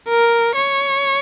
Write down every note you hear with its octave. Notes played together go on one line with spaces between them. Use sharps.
A#4
C#5